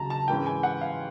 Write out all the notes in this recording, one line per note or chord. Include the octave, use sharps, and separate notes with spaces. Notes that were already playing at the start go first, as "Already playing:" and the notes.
Already playing: D#2 C#3 F#3 A5 A#5
A5
G#2 E3 G#3 C#4 G5
G#5
F#5
F5